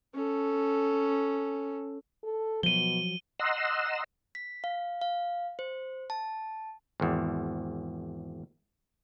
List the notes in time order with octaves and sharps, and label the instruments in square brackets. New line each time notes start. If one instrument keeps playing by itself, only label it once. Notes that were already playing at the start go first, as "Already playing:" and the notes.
[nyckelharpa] C#4 A4
[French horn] A4
[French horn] B2 [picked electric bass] F3 F#3 [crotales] D#7 G7
[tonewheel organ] D#5 F#5 A#5 C6 E6
[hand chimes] B6
F5
F5
C5
A5
[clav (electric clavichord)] G#1 E2